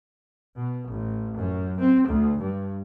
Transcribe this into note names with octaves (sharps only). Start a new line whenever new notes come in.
B2
A1
F#2
C4
D2
G2